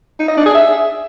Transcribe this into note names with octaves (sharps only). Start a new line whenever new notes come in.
D#4
D#5
D4
G#4
E5